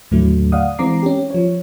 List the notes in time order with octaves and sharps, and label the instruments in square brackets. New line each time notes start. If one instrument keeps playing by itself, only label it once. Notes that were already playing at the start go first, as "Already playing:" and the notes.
[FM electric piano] D#2 A2 D3 F#3 A3
D5 F5 F#5 D#6
E3 G#3 C4 A#5 D6 C7
C#4 G4
F3 C#5